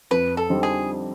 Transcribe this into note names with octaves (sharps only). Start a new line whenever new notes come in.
F2 B4
A4
D3 G3 C4 D#4
G#4